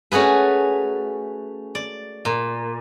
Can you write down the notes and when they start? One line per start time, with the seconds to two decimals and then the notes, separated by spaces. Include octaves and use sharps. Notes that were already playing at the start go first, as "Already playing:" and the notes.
0.12 A3 C#4 F#4 G#4 B4
1.75 D5
2.25 A#2